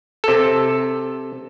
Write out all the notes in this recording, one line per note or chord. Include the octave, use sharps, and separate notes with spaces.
C3 A4